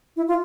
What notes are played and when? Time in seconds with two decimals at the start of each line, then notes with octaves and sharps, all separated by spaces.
0.16 E4
0.28 F4